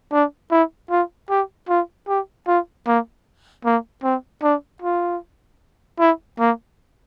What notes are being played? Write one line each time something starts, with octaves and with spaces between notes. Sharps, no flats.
D4
E4
F4
G4
F4
G4
F4
A#3
A#3
C4
D4
F4
E4
A#3